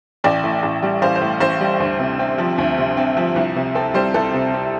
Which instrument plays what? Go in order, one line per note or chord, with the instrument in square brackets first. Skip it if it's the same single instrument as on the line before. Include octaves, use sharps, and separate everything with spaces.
[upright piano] A1 D5 G5
A2
A1
G3
A1 C5 F5
C5
A2
A1 C5
G3
D2
C3
C4
F3
D2
C3
C4
F3
C2
C3
C4 A4
G3 C5
C2 A4
C3
C4